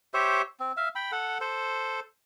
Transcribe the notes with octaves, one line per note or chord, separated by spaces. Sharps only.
G4 C5 C#5 E5
C4
E5 F5
G5 B5
A4 F#5
A4 C5